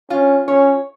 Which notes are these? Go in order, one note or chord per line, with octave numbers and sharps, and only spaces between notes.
C#4 F4
C#4 C#5